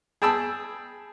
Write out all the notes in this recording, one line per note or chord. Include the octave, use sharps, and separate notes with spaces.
G#4 G5 A5 B5 E6